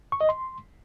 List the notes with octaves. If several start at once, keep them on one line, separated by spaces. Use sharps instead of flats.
C#6
D#5
C6